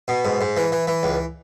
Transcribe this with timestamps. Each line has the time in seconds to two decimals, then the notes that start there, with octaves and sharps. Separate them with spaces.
0.08 B2
0.25 G#2
0.41 G#2
0.57 E3
0.72 E3
0.87 E3
1.03 C#2